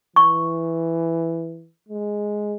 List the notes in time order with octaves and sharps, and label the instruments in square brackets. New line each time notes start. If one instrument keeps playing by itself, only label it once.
[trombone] E3 [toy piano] C#6
[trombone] G#3